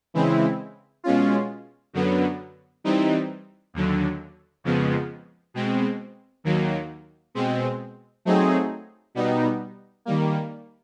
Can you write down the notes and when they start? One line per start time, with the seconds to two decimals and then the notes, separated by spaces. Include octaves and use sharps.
0.14 C#3 E3 G#3 C4 E4
1.04 B2 G#3 C#4 F4
1.93 F#2 D3 F#3 B3
2.84 E3 G3 C4 D#4
3.74 D#2 D3 F#3
4.64 F2 C#3 F3 G#3 B3
5.54 B2 G#3 C4
6.44 D#2 D#3 F#3 A#3
7.35 B2 G#3 C4
8.25 F#3 A3 C4 D#4 G#4
9.15 B2 G3 B3 D#4
10.05 D#3 G3 A#3